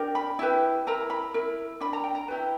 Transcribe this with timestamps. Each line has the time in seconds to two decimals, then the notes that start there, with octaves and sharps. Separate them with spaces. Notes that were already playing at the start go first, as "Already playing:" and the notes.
Already playing: D4 G4 A#4
0.15 B5
0.39 E4 G4 B4
0.87 E4 A#4 A#5
1.10 B5
1.34 E4 A#4
1.80 D4 A#4 B5
1.93 A#5
2.04 G5
2.15 A#5
2.28 E4 G4 B4